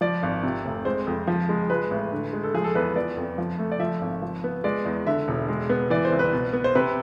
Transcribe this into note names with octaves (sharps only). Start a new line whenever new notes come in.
F3 D5
G#1
C3
F1
G#3 C5
F2
F3
G#3
G#3 B4
A1
D3
G#3
A4
F3 G#4
A4
E2 B4
B3 D5
F2
F3
A3
D5
F3 E5
G#1
F3
B3
G#3 D5
E2
D3 E5
E1
G#3
B3
E3 D5
C5
C2
B4
B2
B3
C5
C3 B4